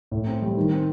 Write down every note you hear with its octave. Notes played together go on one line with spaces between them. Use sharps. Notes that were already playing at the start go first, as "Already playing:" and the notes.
A2
C4
G3
D#3
C4